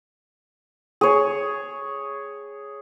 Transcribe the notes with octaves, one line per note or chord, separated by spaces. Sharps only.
G#4 C#5